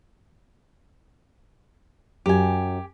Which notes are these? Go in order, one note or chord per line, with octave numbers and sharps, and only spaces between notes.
F#2 F#4 G4 G#5